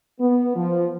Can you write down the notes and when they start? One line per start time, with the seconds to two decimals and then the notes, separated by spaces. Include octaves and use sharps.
0.20 B3
0.56 F3